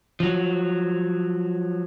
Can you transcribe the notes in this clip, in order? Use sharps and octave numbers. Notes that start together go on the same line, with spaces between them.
F3 F#3